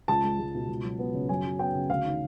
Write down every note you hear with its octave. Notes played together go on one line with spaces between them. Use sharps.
C#2 A5
G#3
C#2
B2
C#2
F#3
B3
C#3
F#2 G#5
F#3
B3 G5
C#3
D2 F5
D#3